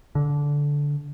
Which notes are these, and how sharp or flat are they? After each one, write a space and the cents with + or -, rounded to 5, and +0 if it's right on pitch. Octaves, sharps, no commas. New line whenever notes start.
D3 -15